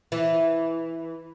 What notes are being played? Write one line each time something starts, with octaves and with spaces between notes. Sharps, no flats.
E3